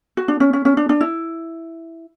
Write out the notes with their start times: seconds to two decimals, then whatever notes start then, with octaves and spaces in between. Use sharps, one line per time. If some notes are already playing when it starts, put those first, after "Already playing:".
0.17 F#4
0.28 D4
0.40 C#4
0.53 C#4
0.65 C#4
0.77 D4
0.89 D4
1.01 E4